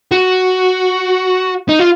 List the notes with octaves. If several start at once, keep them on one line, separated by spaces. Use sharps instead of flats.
F#4
D#4
F4